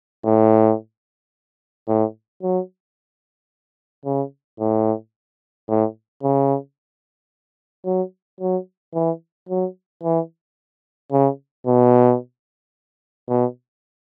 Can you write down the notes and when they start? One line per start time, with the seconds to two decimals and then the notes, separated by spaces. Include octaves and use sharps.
0.25 A2
1.88 A2
2.43 F#3
4.06 C#3
4.60 A2
5.68 A2
6.23 C#3
7.86 F#3
8.41 F#3
8.95 E3
9.49 F#3
10.04 E3
11.12 C#3
11.67 B2
13.29 B2